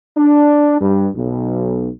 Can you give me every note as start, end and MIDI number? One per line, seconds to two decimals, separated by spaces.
0.17 0.76 62
0.81 1.07 43
1.16 1.89 35